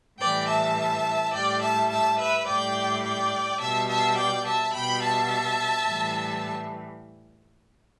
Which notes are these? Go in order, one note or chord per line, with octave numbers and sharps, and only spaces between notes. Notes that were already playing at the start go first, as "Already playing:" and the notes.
A2 E3 G3 D5 G5
E5 A5
A2 G3 D5 G5
E5 A5
E5 A5
B4 E5
A2 G3 D5 G5
D5 G5
B2 G3 E5 A5
E5 A5
D5 G5
E5 A5
B2 G3 G5 B5
E5 A5
A2 E3 G3